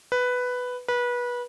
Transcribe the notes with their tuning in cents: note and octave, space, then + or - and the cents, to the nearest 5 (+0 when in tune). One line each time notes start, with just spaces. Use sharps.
B4 +5
B4 -25